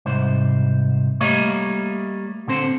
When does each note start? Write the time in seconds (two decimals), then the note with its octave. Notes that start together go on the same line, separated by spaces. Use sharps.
0.06 C2 G#2 C5
1.21 G3 A3 A#3 C#5 D#5 F5
2.47 A#2 D3 C4 C5